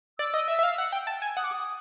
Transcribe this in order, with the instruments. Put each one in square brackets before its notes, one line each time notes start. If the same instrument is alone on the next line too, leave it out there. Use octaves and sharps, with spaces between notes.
[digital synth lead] D5 [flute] E6
[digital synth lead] D#5
E5
E5
F5
F#5
G5
A5
G#5
[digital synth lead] F#5 [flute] D#6
[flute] D6
D#6